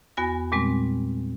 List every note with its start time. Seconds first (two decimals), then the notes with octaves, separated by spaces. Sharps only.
0.17 E2 B3 F#4 G#5 A#6
0.52 A#2 G3 G#3 C4